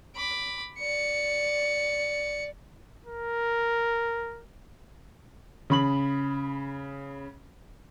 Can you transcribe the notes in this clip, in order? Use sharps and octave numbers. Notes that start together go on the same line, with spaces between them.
B5 D6
D5 C#7
A#4
C#3 B5 F#7